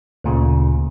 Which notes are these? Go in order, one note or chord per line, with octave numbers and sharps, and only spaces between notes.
D2 A#2 C#3